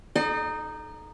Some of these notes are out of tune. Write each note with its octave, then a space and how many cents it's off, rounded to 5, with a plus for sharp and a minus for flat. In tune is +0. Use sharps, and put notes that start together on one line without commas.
D#4 -5 A4 -30 D#5 -45